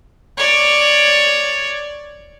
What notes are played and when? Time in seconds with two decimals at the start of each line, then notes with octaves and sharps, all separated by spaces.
0.37 C#5 D5